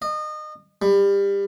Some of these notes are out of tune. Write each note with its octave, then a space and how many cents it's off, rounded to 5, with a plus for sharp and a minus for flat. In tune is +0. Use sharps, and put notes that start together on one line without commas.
D#5 -30
G3 +25